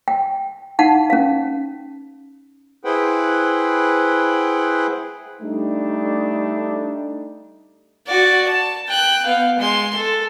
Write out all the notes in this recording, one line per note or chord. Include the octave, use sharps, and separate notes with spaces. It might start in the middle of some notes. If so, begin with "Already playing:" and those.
G5
D#4 F5 F#5 A5
C#4 F5
E4 G#4 B4 C5 F#5 G5
G3 A3 D4 D#4
F#4 D5
A5
G5 F#6
B3 F5
G#3 C6
A4